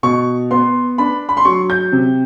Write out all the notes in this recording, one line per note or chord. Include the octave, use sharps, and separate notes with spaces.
B2 C#6
B3 C6
D4 B5
B5
C6
F#3 C#6
G6
C3